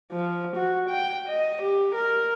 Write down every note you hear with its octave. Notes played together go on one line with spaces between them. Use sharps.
F3
F#4
G5
D#5
G4
A#4